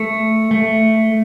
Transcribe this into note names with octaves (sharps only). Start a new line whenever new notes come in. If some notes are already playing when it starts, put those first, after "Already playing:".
Already playing: A3
A3